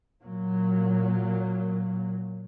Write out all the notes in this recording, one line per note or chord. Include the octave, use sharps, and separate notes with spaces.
A#2 F#3